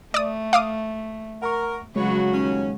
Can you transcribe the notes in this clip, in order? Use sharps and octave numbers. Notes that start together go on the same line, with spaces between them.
A3 D5 D#6
F5 D6 D#6
A#4 F#5 A#5 C#6
F2 C#3 F#3 G#3 F#4 B4 C#5
D#2 C#4